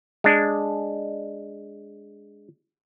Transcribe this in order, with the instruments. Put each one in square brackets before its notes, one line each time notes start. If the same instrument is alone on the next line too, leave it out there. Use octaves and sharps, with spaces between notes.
[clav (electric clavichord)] G#3 D4